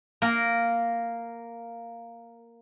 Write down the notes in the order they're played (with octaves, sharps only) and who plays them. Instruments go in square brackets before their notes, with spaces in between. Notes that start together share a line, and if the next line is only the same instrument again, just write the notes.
[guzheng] A#3 A#4